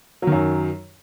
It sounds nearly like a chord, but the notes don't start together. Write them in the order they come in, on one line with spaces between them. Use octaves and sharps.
F#3 D#3 F#2